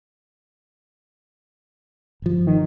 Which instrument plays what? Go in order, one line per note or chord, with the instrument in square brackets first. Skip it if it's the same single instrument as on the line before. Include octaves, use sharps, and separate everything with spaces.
[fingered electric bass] G1 F3
[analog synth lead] D#3